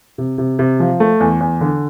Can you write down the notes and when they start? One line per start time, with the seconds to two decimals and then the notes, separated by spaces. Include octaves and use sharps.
0.18 C3
0.38 C3
0.59 C3
0.80 F3
1.00 A3
1.20 E2
1.40 E2
1.61 D3